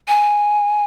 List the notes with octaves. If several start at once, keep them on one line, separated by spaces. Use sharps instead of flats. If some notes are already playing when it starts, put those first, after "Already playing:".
G#5